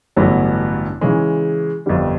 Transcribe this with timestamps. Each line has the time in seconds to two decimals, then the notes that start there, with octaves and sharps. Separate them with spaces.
0.16 A1 G2 D3 F#3 B3
1.01 C#3 E3 G#3
1.86 G1 F2 D3 G3